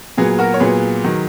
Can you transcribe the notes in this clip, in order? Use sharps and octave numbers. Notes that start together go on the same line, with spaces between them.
A#2 F#3 B3 G#4
F#4 A#4
C#5
A#2 F#3 B3 G#4 B4
D#3 F#3